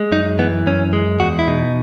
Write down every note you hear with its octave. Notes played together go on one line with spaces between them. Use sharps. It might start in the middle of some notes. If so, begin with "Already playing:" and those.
Already playing: G#3
F#2 D#4
E3 B3
F#2 C#4
G#3
E2 F#4
E4
B2 D#4